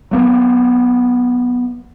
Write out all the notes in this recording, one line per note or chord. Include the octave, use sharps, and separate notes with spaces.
F#3 A#3 B3